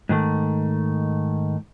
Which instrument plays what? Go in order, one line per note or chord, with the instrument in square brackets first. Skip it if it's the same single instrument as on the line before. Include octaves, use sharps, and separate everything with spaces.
[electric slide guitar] G#2 D#3 A3